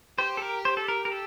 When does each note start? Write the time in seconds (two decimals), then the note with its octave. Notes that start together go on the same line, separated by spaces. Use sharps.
0.18 G4 C5
0.37 A4
0.42 A#4
0.65 C5
0.77 A4
0.88 A#4
1.05 A#4
1.12 A4